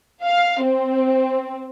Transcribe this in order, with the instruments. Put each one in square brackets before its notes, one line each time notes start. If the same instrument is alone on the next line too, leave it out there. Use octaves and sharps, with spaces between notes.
[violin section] F5
C4